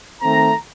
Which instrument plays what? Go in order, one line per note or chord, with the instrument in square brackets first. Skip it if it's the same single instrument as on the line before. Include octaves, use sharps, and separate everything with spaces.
[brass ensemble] D#3 A3 C4 A#5